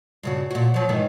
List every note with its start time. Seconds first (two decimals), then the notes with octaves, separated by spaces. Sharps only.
0.23 G2 C#3 F#4
0.51 A#2 F#4
0.74 F3 F#3
0.89 G#2 D#3 E3